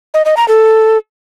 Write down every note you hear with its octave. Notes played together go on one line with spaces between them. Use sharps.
D#5
D#5
A#5
A4